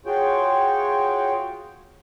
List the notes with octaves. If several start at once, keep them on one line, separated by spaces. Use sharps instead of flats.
F4 F#4 G#4 C#5 G5